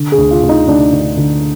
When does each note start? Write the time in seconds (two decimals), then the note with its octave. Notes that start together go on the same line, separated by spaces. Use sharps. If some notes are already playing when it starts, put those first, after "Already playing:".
Already playing: D3
0.12 G#4
0.18 D2
0.31 F4
0.43 D2
0.49 D#4
0.68 D2 D4
0.92 D2
1.17 D3